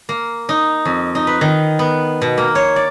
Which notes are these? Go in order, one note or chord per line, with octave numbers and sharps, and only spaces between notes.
A#3
D#4
F2
D#4
B4
D#3
B3
B2
A#3
C#5
D5